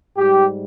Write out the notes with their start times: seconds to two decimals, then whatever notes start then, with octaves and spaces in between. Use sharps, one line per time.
0.16 G#2 G3 G4